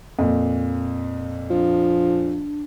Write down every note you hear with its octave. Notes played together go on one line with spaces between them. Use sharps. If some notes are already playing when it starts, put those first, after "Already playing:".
F2 A#2
F3 D4